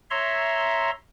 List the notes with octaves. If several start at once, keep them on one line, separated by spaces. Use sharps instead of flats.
C#5 E5 A#5 C6